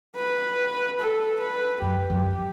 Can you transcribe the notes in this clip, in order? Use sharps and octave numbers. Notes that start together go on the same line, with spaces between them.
B4
A4
B4
F#2 G4
F#2